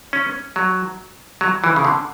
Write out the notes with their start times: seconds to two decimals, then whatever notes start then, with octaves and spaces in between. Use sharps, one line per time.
0.13 C#4
0.56 F#3
1.41 F#3
1.64 E3
1.76 C#3
1.84 D3